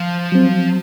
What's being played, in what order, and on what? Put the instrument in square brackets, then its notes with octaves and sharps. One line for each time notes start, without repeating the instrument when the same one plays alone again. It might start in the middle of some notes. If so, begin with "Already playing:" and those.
Already playing: [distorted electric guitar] F3
[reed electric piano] F#3 C4